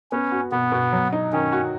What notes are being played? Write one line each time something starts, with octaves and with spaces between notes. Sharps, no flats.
B3 C#4
F#4
B2 B3
B2
F#3
D#4
D#3 C#4
F#4